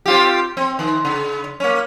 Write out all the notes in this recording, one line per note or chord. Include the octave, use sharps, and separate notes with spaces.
C4 F4 G4
C4
D#3
C#3
A#3 C#4